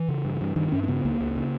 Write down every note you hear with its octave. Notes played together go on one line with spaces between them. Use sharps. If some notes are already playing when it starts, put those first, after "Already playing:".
Already playing: E3
C#3
G2
G2
G2 D#3
G2 C#4
C#4
C#3 B3
C#2 A#3
C#2
C#3